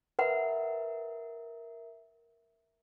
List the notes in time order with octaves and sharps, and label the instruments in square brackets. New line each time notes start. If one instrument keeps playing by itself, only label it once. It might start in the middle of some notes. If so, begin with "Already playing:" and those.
[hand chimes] A#4 E5 [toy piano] B4 F#5 B5